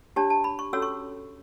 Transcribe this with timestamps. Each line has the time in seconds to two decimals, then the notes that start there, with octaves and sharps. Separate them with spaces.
0.16 D4 G4 C#5 A5
0.30 A5
0.44 B5
0.59 C#6
0.73 C#4 F#4 A4 C#5 E6
0.82 C#6